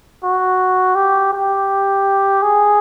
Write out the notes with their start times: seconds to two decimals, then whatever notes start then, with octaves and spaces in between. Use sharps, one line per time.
0.23 F#4
0.96 G4
1.33 G4
2.42 G#4